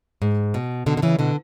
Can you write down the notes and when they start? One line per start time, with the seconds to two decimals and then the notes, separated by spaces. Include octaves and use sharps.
0.22 G#2
0.54 B2
0.86 B2 D3
0.97 D3
1.02 C#3 E3
1.19 B2 D3